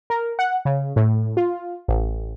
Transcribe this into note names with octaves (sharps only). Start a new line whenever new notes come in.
A#4
F#5
C#3
A2
F4
A1